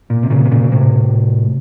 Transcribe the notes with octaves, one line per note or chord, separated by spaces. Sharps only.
A#2
C3
A#2 C#3
C3
A#2 C#3
C#3
A2 C3